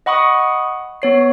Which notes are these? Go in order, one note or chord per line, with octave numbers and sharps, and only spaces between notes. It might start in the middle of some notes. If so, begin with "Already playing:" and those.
D#5 F#5 B5 C#6 D#6
B3 C#5 C7